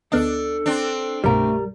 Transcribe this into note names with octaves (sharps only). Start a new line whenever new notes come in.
D2 B3 D4 A4 D#5
C4 D4
C2 G2 B2 G3 A3 A#4